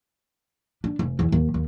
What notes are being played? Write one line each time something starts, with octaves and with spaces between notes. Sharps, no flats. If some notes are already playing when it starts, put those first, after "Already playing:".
D4
F1
E2 E3
D#2
D#2